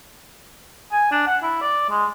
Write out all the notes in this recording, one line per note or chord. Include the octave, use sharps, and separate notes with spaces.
G#5
D4
F#5
E4
D5
G#3